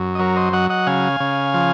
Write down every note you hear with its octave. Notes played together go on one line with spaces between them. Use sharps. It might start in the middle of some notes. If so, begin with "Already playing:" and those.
Already playing: F#2
D#5
F#3 A#4 C#5
C5 D#5
F#3 D#5 F#5
D#5 F#5
C#3 F5 G#5
C#3
F3